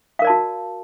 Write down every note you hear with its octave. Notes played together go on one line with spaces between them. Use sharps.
F#4 A#4 D5 F5 A5